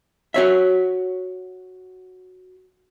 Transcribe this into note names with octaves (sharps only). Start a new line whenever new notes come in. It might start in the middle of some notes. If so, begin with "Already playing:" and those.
F#4 C#5 E5